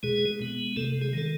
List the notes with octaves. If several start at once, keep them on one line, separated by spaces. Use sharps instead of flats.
B2 G#3 G#4
G#3 B3
C3 A3 A4
G#3 G#4
D#3 G#3 A4